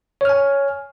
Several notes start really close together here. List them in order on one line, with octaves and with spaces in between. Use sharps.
C#5 F6 G#5